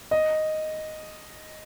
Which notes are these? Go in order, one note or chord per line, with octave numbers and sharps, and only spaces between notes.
D#5